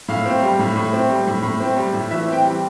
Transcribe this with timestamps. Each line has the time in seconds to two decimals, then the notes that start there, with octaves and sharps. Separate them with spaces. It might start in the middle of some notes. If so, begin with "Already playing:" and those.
0.08 A2 F5
0.26 C4
0.42 G3
0.59 A2
0.76 A2
0.93 C4
1.10 G3
1.27 A2
1.43 A2
1.60 C4
1.76 G3
1.93 A2
2.10 E3 E5
2.27 C4
2.32 G5
2.44 G3